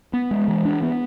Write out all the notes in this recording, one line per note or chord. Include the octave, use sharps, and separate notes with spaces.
B3
G#3
E3
D4
B3